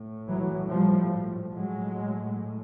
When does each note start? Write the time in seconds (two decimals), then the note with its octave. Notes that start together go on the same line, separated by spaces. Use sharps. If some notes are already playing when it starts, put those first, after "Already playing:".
Already playing: A2
0.28 E3 F#3
0.70 F3 G3
1.54 A2 F#3 G#3